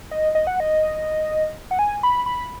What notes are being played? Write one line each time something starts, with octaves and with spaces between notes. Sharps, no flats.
D#5
D#5
F#5
D#5
F#5
G#5
B5
B5